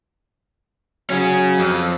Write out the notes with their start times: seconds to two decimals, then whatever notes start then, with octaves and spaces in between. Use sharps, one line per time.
1.10 F#3 C#4 G#4
1.58 F2